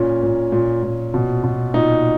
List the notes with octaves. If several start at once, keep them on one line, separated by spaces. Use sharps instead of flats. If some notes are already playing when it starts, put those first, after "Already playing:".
Already playing: A#2 C#4
A#2
A#2
A#2
B2
B2
A#2 D#4